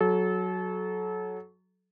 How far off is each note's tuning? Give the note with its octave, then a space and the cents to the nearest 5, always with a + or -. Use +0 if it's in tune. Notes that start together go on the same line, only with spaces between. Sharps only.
F#3 +0 A4 -30